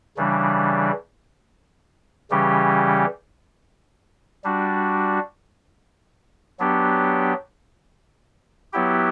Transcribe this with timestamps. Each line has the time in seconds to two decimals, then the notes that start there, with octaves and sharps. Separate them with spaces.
0.17 C#3 E3 G3 D4
2.30 C#3 E3 G3 C#4 G4
4.44 G3 D4 F#4
6.59 F#3 B3 D4 G4
8.73 F#3 B3 E4 G4